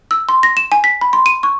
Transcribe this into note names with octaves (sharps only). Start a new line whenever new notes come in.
E6
C6
A#6
E7
G#5
B6
B5
C6
D#7
C#6